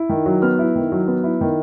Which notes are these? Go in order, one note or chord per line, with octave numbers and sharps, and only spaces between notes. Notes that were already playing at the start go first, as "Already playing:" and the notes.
Already playing: E4
D#3
F#3
B3 F6
E4
D#3
F#3
B3
E4
D#3